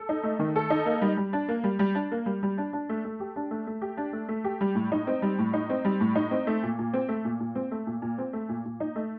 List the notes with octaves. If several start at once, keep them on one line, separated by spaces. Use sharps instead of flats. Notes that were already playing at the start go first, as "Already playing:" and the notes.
Already playing: A4
D#4
A3
D#3
A4
D#4
A#3
G3
G3
D4
A#3
G3
G3
D4
A#3
G3
G3
D4
D4
A3
A3
G4
D4
A3
A3
G4
D4
A3
A3
G4
G3
A2
D#4
C4
G3
A2
D#4
C4
G3
A2
D#4
C4
A3
A#2
A#2
C4
A3
A#2
A#2
C4
A3
A#2
A#2
C4
A3
A#2
A#2
D#4
A3